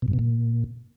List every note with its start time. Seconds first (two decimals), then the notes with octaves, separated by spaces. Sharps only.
0.02 B2
0.08 G2
0.13 B2
0.19 A#2